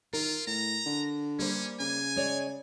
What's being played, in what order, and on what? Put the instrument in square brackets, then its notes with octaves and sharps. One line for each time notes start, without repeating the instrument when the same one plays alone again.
[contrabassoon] D#3 [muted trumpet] F4 [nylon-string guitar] A#4
[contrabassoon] A2 [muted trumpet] A#5
[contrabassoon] D3
[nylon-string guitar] G3 A#3 C5 [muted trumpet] C#4
[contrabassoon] C#3 [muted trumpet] G#5
[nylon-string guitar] G#3 C#5 D5